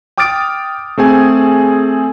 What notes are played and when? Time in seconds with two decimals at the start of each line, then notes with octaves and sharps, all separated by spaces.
0.17 G5 D6 D#6 F6 A6 D7
0.98 A3 C4 G#4 G#5